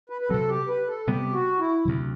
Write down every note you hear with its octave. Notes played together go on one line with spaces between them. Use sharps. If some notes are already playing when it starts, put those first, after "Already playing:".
B4
B4
C3 F#3 C4 A4
G4
B4
A4
C3 G3 B3 G4
F#4
E4
D2 C3 F#3